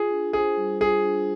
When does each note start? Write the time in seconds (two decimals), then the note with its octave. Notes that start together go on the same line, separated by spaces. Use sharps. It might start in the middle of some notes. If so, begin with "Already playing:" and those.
Already playing: F4 G#4
0.10 D4
0.33 G#4 C5
0.57 G3
0.80 F4 G#4
1.04 D4